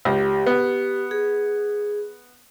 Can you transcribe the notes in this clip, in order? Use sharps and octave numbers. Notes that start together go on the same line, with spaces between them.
C#2 G4
B3
G#4